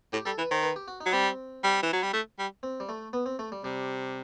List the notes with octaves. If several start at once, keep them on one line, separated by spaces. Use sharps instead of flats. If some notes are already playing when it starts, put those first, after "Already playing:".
A2 G4
G3 A4
E3 B4
D#3 C5
B4
G4
F#4
D#4
F#3
G3 C4
G3
E3
F#3
G3
A3
G3
C4
G3
A3
B3
C4
A3
G3
C3 G3